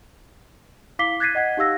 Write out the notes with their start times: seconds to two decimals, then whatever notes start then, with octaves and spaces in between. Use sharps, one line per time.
0.99 E4 F5 D6 B6 C7 G7
1.20 F#6 G#6 A6 B6 C7 D#7
1.35 D#5 F#5 G#6 B6
1.57 D#4 G4 F5 E6 A#6